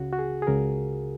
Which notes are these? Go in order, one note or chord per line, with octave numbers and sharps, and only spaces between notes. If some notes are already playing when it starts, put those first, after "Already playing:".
Already playing: C#2 C#3 F#4
F#4
G#4
G#4
C#2 C#3 A#4